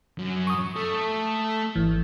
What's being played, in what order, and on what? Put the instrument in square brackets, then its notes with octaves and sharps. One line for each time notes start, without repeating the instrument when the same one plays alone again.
[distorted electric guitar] F#2
[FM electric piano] C#6 D#6
[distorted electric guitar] A3
[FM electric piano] G#1 E3